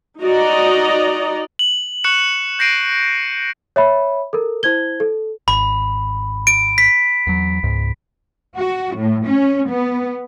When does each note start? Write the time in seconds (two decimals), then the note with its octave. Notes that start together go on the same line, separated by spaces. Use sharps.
0.23 D#4 F#4 D5 D#5 A#5
1.59 F#7
2.04 C#6 F#6 C#7 E7
2.59 G6 A#6 C7 D7 D#7
3.76 C#5 E5 B5
4.33 A4 A#4
4.63 E4 C5 G#6 G7
5.00 A4
5.48 G#1 B5
6.47 D7
6.78 B6
7.27 E2 F#3
7.63 C#2 G#2
8.56 F#4
8.96 A2
9.27 C#4
9.69 B3